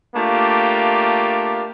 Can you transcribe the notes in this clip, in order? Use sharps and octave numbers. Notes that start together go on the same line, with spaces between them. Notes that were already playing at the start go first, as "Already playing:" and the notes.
A3 A#3 D4 F4 G4